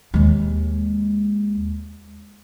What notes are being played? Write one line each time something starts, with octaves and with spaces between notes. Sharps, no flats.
D#2 G#3